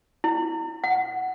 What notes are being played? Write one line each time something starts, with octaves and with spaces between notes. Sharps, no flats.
E4
F#5